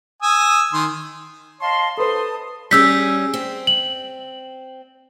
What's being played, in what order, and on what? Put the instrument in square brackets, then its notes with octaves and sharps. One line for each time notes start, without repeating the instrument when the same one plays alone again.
[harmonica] G#5 D#6 E6
D#3 C6
[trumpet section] C#5 C6 [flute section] D#5 F5 A5
[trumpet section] D#4 B5 C6 [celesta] A4 B4 C5 [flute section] A5 D#6
[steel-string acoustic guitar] G3 C#4 G#4 [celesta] E6 G6 B6
[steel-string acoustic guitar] C4
[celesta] F#7